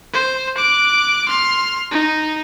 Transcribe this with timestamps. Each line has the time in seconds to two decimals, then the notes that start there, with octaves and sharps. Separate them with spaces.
0.14 C5
0.57 D6 F#6
1.28 C6 F6
1.92 D#4